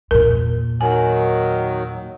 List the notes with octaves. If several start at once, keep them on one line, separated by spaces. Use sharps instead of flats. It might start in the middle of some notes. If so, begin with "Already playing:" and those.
E2 A#2 A#4
D#3 F#3 G#5